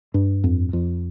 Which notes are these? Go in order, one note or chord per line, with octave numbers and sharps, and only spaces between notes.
G2
F2
F2